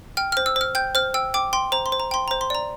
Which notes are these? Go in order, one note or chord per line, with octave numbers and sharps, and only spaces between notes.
G5 F6
C5 F6
E6
C5 F6
G5 G6
C5 F6
G5 E6
G5 D6
G5 C6
C5 A#5
C6
C5
A#5
G5 C6
C5 A#5
C6
D5 A#5